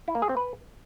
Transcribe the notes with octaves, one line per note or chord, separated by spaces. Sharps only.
E4
A#3
G#4
C4
B4